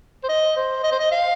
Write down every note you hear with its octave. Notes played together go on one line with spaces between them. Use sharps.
C5
D#5
C5
D#5
C5
D#5
F5